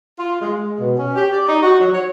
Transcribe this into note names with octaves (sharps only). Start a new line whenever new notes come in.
F4
G#3
G#3
B2
C#4
G4
D5
D#4
F#4
F#3
C#5